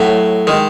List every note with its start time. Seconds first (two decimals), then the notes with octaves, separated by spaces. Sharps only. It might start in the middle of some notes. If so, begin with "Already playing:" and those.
Already playing: A2 F#3
0.47 D#3 G#3